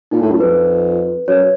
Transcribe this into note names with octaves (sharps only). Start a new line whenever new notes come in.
A#2 D#4
A2 D#4
F#2 F4
F2 B4
F#2 C#5